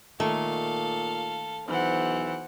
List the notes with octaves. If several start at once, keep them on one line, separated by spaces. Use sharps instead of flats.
A#2 D#3 A3 A4 F5
B1 E3 C5 F#5